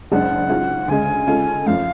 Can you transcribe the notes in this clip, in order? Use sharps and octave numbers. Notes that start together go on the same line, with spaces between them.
F#1 F#2 C#3 G#3 D4 F#5
G#2 F#3 C#4 F4 G#4
D2 C#3 G#3 G#5
C#3 G#3 C#4 F4 A4
F#2 F3 A3 C#4 F5